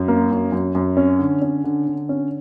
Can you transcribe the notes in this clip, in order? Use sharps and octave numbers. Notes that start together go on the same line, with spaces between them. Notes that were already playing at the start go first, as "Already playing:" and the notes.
Already playing: F#2
A#3
F#2
F#2
F#2
C#4
D3
C#4
D3
D3
C#4